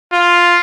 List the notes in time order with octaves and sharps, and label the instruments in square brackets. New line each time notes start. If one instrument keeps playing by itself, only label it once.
[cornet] F4